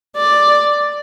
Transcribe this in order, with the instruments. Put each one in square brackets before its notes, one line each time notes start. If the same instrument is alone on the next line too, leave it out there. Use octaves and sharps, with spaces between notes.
[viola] D5